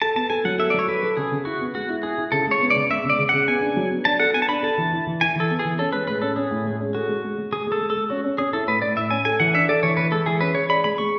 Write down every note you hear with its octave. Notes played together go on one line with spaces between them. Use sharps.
A4 A5
B3 A5
A4 G#5
F#3 F#5
A4 E5
F#3 D5
C#5
A4 B4
A4
C#3 G#4
C#3
E4 F#4
B3
G#3 F#4
E4
E4 G#4
E4
C#3 A4
G#3 C#5
B3
D5
C#3
G#3 E5
C#3
D5
C#3
C#3 F#5
B3 G#5
D4
F#3
B3
D4 A5
A4 F#5
B3 G#5
A5
D4 B5
A4 A5
E3
E4
E3
E4 G#5
E3 A4
B3
G#4
E3
C#4 A4
G#3 B4
A2 B4
C#4 A4
C#4 G#4
A2
G#3
C#4
F#4 A4
G#3
G#3
G#3
G#3 G#4
G#3
A4
G#3
A4
G#3
C#4 F#4
C#4
C#4 G#4
E4 A4
A2 B4
A2 D5
A2 E5
C#4 G#5
A4 G#5
E3 F#5
D4 E5
A4 D5
E3 C#5
E3 B4
G#3 A4
E3 G#4
C#4 B4
G#4 C#5
D5 B5
G#3 B5
G#3 C#6